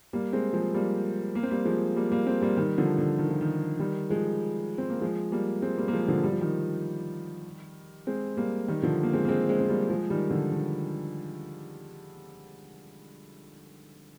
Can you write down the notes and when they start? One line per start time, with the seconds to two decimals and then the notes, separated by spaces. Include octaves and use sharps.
0.13 G3 A#3
0.33 G#3 C4
0.53 F3 G#3
0.74 G3 A#3
1.35 A#3
1.43 C4
1.51 G3 A#3
1.65 F3 G#3
1.96 G3 A#3
2.11 G3 A#3
2.27 G#3 C4
2.42 G3 A#3
2.57 D#3 G3
2.78 D3 F3
2.98 D3
3.18 D#3
3.30 F3
3.41 D#3
3.79 D#3 G3
4.10 F3 G#3
4.78 C4
4.90 A#3
5.02 F3 G#3
5.32 G3 A#3
5.62 G#3 C4
5.78 G3 A#3
5.88 A#3
5.93 F3 G#3
6.08 D3 F3
6.24 G3
6.32 F3
6.41 D#3 G3
8.07 G#3 C4
8.37 G3 A#3
8.68 D#3 G3
8.83 D3 F3
9.03 A#3
9.13 G#3 C4
9.25 A#3
9.29 G#3 C4
9.49 G#3 C4
9.60 C4
9.69 G3 A#3
9.90 F3 G#3
10.10 D#3 G3
10.30 D3 F3
10.51 D#3